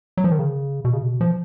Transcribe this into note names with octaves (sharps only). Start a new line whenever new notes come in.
F#3
F3
D#3
C#3
B2
C#3
B2
F3